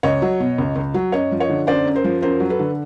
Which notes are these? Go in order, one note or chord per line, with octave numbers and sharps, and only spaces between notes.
C#2 C#5 D#5
F#3
B2
C#2
C#2
F#3
F#2 C#5 D#5
F3
C#5 D#5
D3
F#2 C5 D5
F#2
A#4 C5
F3
F#2 A#4 C5
F#3
A4 B4
D3